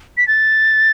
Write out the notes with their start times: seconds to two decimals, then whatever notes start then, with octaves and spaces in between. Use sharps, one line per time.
0.17 B6
0.28 A6